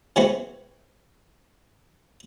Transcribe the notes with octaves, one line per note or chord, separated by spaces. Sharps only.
E3 G#3 B3 C4 F#4 C5